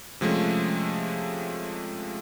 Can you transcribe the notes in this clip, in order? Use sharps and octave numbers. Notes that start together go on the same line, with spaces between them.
C3 F3 G#3 A3 C#4